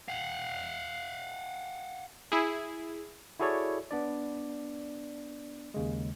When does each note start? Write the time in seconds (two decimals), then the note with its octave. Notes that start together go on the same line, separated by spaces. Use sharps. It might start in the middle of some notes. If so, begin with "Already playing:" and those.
0.09 F5 F#5
2.32 E4 G#4
3.39 E4 F#4 G#4 A4 C#5 D5
3.91 B3 D4 D5
5.74 D#2 C#3 G#3